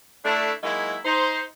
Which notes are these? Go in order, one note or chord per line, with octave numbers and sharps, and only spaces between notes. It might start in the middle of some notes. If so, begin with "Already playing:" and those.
A3 D4 E4
F#3 G#3 A#3 D#4 E4
D#4 C5